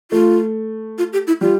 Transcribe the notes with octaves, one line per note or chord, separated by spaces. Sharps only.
A3 F4
F4
G4
E4
G3 F4